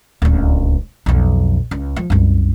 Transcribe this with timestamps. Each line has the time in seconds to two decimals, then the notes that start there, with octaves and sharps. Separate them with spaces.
0.22 D1 C#2
1.06 B1 F2
1.71 C#2
1.96 F3
2.10 C2 F#2